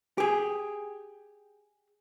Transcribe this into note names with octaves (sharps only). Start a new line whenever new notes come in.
G4 G#4